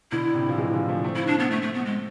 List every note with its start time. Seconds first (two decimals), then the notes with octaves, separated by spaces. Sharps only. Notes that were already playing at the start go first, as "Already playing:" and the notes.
0.11 B2 D3 E4
0.24 D3
0.34 A2 C3
0.49 F3
0.58 E3 G#3
0.73 D3 F3
0.89 F3 A3
1.04 A3 C4
1.16 E4
1.27 D4
1.39 B3
1.51 A3
1.62 A3
1.74 B3
1.86 G#3